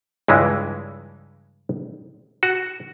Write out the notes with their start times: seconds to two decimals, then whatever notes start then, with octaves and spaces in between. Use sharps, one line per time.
0.28 C#2 G2 E3 G#3
2.43 F#4